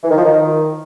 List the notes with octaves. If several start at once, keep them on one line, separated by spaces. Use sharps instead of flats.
E3
D#3
F3
D#3